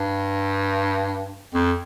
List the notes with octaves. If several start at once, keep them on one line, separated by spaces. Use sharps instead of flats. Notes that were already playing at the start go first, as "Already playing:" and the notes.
Already playing: G2
F2